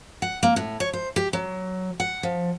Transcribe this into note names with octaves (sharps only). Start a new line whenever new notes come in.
F#5
A#3
A2
C#5
C5
G4
F#3
F#5
F3